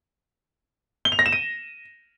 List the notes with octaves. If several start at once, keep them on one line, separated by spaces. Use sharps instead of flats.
G7
F7
A#6
E7
D#7